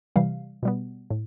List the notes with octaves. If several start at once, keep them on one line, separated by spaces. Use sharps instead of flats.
C3 E3 G3 F5
B2 G3 B3
A2